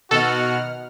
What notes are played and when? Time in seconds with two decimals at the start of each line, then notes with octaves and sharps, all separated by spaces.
0.11 B2 D#3 F#4 A4 F#5 F6